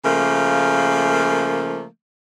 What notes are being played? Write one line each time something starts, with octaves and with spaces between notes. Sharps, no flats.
C#3 F3 A3 A#3